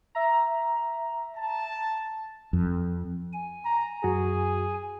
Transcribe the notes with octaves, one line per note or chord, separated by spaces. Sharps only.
E5 A#5
A5
F2
G#5
A#5
F#2 F#4 G#4